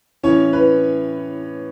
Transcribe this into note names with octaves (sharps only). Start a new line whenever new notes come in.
A2 E3 C#4 C#5
B4